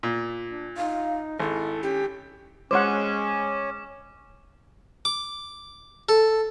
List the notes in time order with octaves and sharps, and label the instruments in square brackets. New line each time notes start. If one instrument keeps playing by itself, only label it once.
[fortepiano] A#2
[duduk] D4
[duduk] D#4 [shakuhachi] F5
[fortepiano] G#1 [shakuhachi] E4 [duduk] A4
[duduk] C#4 [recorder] G4
[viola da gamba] G#3 [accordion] C#4 [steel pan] C5 C#5 F#5 [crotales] D6
[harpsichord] D6
A4